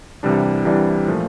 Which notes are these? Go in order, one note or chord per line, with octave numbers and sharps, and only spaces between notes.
C2 C3 E3 G3 D4
C2 C3 E3 G3 D4
A#2 F3 A3